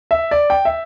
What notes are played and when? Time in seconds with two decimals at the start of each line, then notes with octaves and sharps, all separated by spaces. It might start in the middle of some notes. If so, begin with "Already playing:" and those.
0.11 E5
0.31 D5
0.50 G5
0.65 E5